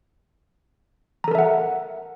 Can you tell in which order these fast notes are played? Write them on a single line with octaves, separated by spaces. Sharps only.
A#5 A4 A#4 E5 F#5